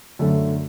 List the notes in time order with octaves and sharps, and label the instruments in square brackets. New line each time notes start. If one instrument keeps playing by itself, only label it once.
[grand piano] F#2 D3 A3